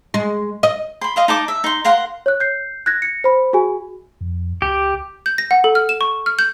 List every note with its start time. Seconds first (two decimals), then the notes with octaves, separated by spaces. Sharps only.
0.14 G#3
0.63 D#5
1.01 B5 C6
1.16 D#5 F5 C6
1.28 D#4 A5 D6
1.48 E5
1.64 D#4 C6
1.85 A#4 F5 F#5 C6
2.26 C#5 F#6
2.40 G6 C7
2.86 F#6 G#6 A#6
3.02 A#6 C#7
3.24 C5 B5
3.53 F#4 G#4 G#5
4.21 F2
4.62 C#2 G4
5.26 G6
5.38 A#6
5.51 F#5
5.64 A4
5.75 F6
5.89 E7
6.01 C#6
6.26 F6
6.39 G6